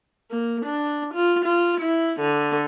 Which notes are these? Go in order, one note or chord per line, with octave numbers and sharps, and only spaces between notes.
A#3
D4
F4
F4
E4
D3